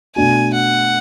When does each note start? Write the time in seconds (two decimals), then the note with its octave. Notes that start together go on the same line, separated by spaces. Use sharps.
0.16 B2 A3 D4 F#4 G#5
0.54 F#5